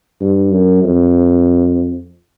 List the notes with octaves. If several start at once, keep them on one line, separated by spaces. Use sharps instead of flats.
G2
F#2
F2